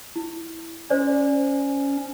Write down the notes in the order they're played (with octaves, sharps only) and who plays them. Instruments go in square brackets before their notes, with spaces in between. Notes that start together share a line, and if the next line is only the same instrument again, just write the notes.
[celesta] E4
[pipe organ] C#4 [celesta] C5 D5